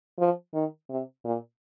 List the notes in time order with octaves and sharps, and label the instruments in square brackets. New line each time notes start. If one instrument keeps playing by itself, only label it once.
[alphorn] F3
D#3
C3
A#2